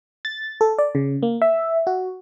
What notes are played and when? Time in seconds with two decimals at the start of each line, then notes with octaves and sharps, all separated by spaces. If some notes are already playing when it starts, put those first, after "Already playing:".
0.25 A6
0.61 A4
0.78 D5
0.95 C#3
1.23 A#3
1.42 E5
1.87 F#4